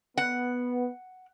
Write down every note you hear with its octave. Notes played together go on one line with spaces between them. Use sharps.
B3 F#5